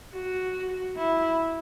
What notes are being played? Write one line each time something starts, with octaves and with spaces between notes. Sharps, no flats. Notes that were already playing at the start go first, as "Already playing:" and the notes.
F#4
E4